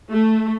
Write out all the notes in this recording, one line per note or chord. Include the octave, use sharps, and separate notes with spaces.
A3